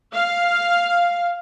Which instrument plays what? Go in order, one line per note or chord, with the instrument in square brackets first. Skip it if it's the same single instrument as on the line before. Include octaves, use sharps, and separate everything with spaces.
[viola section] F5